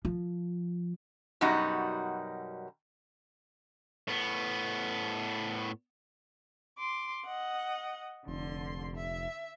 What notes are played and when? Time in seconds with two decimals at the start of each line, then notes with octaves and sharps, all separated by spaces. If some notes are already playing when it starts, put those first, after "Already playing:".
0.05 F3
1.41 F#2 B2 G3 D#4 F#4
4.08 A2 B3
6.78 C6 D6
7.25 D#5 F#5
8.28 F1 D3 C6
8.97 E5